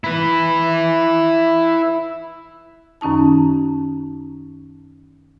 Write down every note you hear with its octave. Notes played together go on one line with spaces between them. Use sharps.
E4 B4
F#2 D#3 C#4 D#4 A5